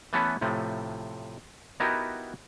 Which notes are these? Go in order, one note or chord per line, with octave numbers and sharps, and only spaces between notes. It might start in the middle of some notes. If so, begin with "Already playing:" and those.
E3 A3 B3 C#4 A4 B4
A2 C3 F3 A3
B3 D#4 E4 F#4 G4 A#4